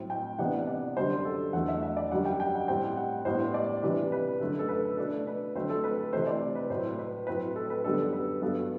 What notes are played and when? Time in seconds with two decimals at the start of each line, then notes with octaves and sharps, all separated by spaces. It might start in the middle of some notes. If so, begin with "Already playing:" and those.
Already playing: A2 F#3 C4
0.10 G5
0.39 C3 E3 B3 D4 F#5
0.67 D5
0.97 F#2 D3 G3 C5
1.25 A4
1.53 E2 D3 F#3 A3 F#5
1.68 E5
1.83 E5
1.97 D5
2.11 F#2 D3 G3 F#5
2.26 G5
2.40 G5
2.54 F#5
2.68 A2 G3 C4 G5
2.97 F#5
3.25 A2 G3 B3 D4 C5
3.54 D5
3.83 C3 E3 G3 D4 B4
4.12 B4
4.41 F#2 D3 A3 A4
4.59 A4
4.69 B4
4.97 B2 A3 D4 A4
5.27 B4
5.55 D3 F#3 A3 C4 C5
5.69 A4
5.84 B4
5.98 A4
6.13 C3 E3 A3 C4 C5
6.27 D5
6.55 B4
6.70 A2 F#3 A3 C5
6.99 B4
7.27 A2 F#3 C4 B4
7.56 A4
7.70 B4
7.84 F#2 D3 G3 B3 A4
8.13 B4
8.42 G2 F#3 B3 A4